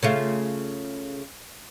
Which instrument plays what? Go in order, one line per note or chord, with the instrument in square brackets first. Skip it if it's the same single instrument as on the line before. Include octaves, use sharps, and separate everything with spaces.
[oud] C#3 A3 F4